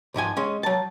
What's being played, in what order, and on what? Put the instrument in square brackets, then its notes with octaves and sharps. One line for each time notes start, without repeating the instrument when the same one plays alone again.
[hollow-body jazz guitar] C2 G#2 F3 G#5
G#3 C#4
F#3 A5